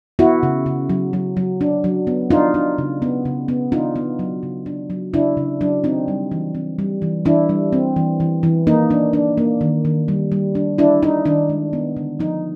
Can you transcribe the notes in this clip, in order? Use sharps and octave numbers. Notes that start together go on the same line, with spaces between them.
B3 E4 F#4
C#3
C#3
F#3
F#3
F#3
D4
F#3
B3
D4 D#4 F4
D4
C#3
B3
C#3
B3
D4 D#4 F4
B3
F#3
C#3
D4
F#3
C#3 D4 E4
C#3
F#3 D4
C4 D#4
G3
E3
C4
G3
E3
E3 D4 E4
G3
C4
E3
E3
E3
A#3 D#4
D4
D4
A#3
D#3
D#3
G3
G3
D4
D4 E4
D4 D#4
D#3 D4
G#3
B3
D3
F3 D#4